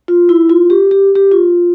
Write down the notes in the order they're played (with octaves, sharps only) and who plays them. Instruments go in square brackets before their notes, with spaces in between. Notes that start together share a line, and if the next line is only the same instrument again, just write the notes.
[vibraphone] F4
E4
F4
G4
G4
G4
F4